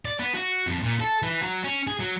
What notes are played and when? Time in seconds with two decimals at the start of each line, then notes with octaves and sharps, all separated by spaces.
0.05 D5
0.19 B3
0.35 F#4
0.67 F2
0.83 A#2
1.00 A4
1.22 E3
1.43 F#3
1.64 C#4
1.87 G#4
2.00 F#3